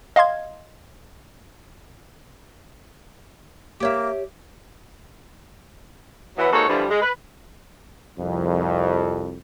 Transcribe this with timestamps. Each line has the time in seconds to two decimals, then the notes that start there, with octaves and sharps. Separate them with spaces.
0.16 D#5 F5 A5 C6 G#6
3.80 A#3 G4 C#5 E5
6.38 E3 F#3 B3
6.53 G#2 A#3 D#4 F#4 A4 C#5
6.68 G2 D3 E3 F3 G3
6.90 G#3
7.02 B4
8.17 C2 F2